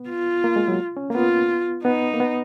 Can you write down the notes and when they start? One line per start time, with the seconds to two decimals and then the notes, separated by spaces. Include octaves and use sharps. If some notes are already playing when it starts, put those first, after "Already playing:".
Already playing: B3
0.09 F4
0.44 A#3
0.56 G#3
0.68 F#3
0.97 C#4
1.10 A#3
1.15 B3 F4
1.85 B3 D#4
2.14 A#3
2.20 B3